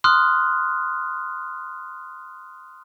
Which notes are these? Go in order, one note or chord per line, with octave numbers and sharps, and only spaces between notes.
C6 D#6 F6 F#6